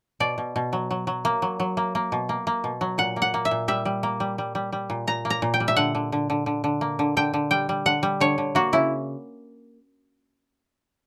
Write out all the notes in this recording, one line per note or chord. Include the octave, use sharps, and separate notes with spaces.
B2 D5
B2
B2
F#3
F#3
F#3
A#3
F#3
F#3
A#3
A#3
B2
A#3
A#3
B2
F#3
A#2 F#5
A#3
F#5
A#3
E5
A#2
G3 E5
G3
A#3
G3
G3
G3
G3
A#2
A#2 A#5
A#3
A#5
A#2
G5
G3
E5
D3 F#5
D3
D3
D3
D3
D3
A#3
D3
D3 G5
D3
G3 G5
G3
D3 F#5
G3
D3 C#5
D3
A#3 F#4
C#3 E4